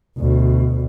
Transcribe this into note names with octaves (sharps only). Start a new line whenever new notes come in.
D2 B2